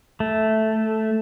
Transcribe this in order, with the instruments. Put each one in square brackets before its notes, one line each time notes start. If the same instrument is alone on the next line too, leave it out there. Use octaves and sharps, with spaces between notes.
[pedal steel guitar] A3